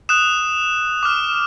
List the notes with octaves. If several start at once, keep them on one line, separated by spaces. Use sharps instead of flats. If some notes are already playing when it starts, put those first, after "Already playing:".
D#6 F#6 E7
D6 F6